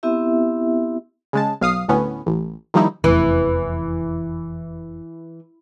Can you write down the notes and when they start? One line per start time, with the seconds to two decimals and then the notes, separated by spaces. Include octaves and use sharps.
0.03 B3 C4 E4 G4 E5
1.33 C#3 G#3 A5
1.61 B1 F5 D#6 C7
1.88 D2 A2 B3 C#4
2.26 A1
2.74 D#3 F3 G3 A#3 D#4 E4
3.04 F1 E2 E3